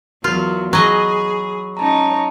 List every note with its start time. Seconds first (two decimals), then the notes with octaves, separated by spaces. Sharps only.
0.24 E2 F#3 F4 F#4 A#4
0.73 F#3 G#4 D#5 B5
1.77 C#4 D#4 C#5 A5 A#5